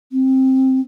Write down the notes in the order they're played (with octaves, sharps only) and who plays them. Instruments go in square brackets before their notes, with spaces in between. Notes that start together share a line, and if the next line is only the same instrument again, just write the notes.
[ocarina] C4